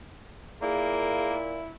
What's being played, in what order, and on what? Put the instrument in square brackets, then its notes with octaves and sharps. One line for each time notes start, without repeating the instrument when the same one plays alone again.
[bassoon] A#2 [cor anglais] A#3 [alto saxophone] E4 [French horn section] G#4